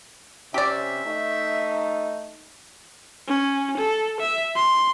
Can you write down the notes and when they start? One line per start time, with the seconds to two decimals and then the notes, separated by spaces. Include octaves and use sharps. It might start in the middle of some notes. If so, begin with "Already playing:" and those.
0.54 C3 C4 C#4 G4 D5 E5
1.05 A3 D#4
3.28 C#4
3.78 A4
4.20 E5
4.56 C6